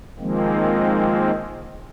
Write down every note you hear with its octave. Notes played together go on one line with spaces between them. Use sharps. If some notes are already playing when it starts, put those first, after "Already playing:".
D#3 F3 G#3 A#3 C4